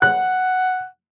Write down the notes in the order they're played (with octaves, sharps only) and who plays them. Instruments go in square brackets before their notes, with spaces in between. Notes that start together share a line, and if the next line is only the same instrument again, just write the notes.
[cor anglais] F#5 [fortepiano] F#6